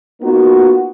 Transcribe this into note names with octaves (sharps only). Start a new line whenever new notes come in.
A#3 B3 D#4 F4 F#4